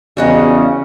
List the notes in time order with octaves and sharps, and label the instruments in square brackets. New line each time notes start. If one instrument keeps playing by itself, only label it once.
[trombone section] E2 C#3 [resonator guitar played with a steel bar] G3 F#4 D#5